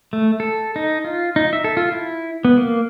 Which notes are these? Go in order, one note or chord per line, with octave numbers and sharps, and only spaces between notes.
A3
A4
D#4
F4
D#4
E5
A4
F4
E4
B3
A#3